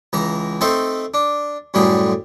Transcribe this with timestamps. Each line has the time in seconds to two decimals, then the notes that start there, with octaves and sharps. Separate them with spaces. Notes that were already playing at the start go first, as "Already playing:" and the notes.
0.13 C#2 E3 A#5
0.61 A3 C4 D#4 A4 C5
1.14 D4
1.74 F#2 A2 D3 G3 G#4